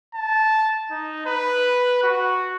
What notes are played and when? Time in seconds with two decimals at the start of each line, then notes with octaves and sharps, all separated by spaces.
0.15 A5
0.91 D#4
1.26 B4
2.03 F#4